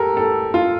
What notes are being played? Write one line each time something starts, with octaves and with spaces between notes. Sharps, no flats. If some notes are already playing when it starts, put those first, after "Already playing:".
Already playing: G4 A4 A#4
A4
F4